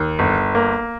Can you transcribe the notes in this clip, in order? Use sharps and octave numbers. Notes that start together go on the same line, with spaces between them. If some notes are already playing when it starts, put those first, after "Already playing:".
Already playing: D#2
G1
A#3